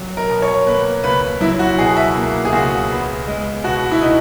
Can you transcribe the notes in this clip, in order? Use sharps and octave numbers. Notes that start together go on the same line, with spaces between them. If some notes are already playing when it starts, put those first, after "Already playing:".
Already playing: F#3
A#4
B2
C#5
A#3 B4
C#2 B4
F#3 E4
F#4
B2 G#4
E5
A#3
G#4
C#2 F#4
B3
G#3
B2 F#4
E4
B2 D#4